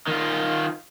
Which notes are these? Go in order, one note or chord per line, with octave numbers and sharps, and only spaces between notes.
D#3 F4